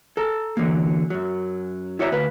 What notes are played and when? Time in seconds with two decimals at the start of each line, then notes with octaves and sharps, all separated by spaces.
0.17 A4 A#5
0.57 D3 E3 F#3 A#3
1.10 F#2 F#3
1.99 E4 F#4 C#5 D5 E5 A#5
2.12 D2 B4 F5